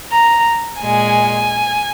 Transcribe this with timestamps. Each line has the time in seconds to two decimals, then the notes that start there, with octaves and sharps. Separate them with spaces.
0.11 A#5
0.81 A#2 G#3 G#5